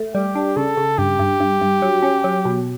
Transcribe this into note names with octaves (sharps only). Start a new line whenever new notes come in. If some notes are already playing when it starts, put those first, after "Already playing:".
Already playing: A3
G3 G4
D4
C#3 A4
C#3
G2 G4
G2
G2
G2
F#3
C#4
F#3
B2